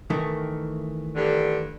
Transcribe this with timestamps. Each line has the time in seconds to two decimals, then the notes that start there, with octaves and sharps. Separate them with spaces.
0.10 D#3 E3 A3
1.16 G2 D3